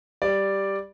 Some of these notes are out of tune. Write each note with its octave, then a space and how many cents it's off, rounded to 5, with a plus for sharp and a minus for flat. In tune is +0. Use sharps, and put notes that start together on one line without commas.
G3 +0 D5 +0